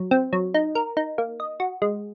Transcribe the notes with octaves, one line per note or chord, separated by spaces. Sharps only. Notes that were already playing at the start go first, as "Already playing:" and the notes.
Already playing: F#3
C4
F#3
D#4
A#4
D#4
A#3
D#5
F#4
G#3